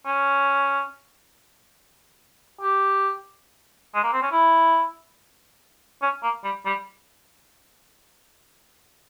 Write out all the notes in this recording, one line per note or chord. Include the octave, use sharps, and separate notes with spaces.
C#4
G4
G#3
A#3
C4
C#4
E4
C#4
A#3
G3
G3